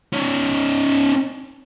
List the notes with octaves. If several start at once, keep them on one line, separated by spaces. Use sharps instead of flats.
C#4 D#4